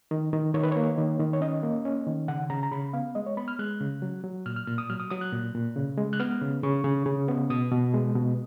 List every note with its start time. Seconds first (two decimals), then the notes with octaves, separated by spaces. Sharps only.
0.11 D#3
0.33 D#3
0.54 D#3 C#5
0.63 B4
0.71 A#3 C#5
0.98 D#3
1.19 D#3
1.33 C#5
1.41 C#4 D#5
1.63 A#3
1.85 C#4
2.07 D#3
2.28 C#3 F#5
2.50 C#3 A#5
2.63 A#5
2.72 C#3 B5
2.93 B3 F5
3.15 G#3 D#5
3.26 C#5
3.37 B3 B5
3.48 F6
3.59 G#3 F#6
3.81 C#3
4.02 F#3
4.24 F#3
4.46 A#2 F6
4.56 F6
4.67 A#2 F6
4.78 D#6
4.90 F#3 F6
5.00 D#6
5.11 F#3 D#6
5.21 F#6
5.33 A#2
5.55 A#2
5.76 C#3
5.98 G#3
6.13 F#6
6.20 B3 F6
6.42 C#3
6.63 C#3 C#6
6.84 C#3
7.06 C#3
7.28 B3
7.50 B2 D#6
7.71 B2
7.94 G#3
8.15 B2